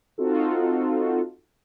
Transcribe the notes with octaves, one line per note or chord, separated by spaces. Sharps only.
C4 D#4 F4 F#4 A4